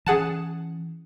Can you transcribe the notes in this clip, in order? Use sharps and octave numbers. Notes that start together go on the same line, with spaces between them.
E3 C#4 G#4 F#5 A5